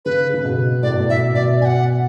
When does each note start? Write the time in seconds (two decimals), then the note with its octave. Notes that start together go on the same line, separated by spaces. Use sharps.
0.05 C#3 B4
0.34 C#3
0.45 B2
0.83 A2 D5
0.91 B2
0.99 A2
1.09 B2 E5
1.35 B2 D5
1.61 B2 G#5
1.65 F#5